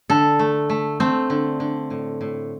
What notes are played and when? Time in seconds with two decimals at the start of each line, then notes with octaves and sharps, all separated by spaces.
0.10 D3 A4
0.39 A3
0.69 A3
1.00 A3 C4
1.30 D3
1.60 D3
1.90 A2
2.21 A2